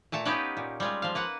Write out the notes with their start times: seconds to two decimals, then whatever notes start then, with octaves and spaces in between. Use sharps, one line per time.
0.12 A#2 A3 A5 A#5
0.25 B3 C#4 D#4 G4 A#4 B4
0.57 A#2
0.80 G3 G#3 F4
1.02 F3 F5
1.15 A#3 B4 F#5